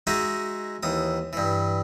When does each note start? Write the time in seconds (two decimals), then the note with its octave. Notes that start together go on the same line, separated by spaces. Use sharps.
0.07 G#3 D#4 F#4 G#4 E5
0.83 D#2 E3 D#6
1.33 G2 E3